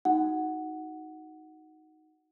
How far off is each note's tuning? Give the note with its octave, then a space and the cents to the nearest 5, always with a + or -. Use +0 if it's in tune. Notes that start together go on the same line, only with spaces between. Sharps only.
D#4 +10 F#4 +0 F#5 +0